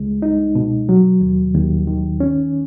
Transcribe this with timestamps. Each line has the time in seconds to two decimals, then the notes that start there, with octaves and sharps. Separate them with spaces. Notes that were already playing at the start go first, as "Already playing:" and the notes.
Already playing: C#2 G#3
0.22 D#4
0.55 B2
0.89 F#3
1.21 D#2
1.54 D#2
1.87 D#3
2.20 C#4